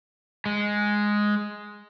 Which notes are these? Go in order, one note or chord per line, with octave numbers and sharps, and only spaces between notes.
G#3